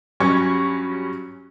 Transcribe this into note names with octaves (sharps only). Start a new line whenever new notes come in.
G2 F#3 C#4 C#6 G#6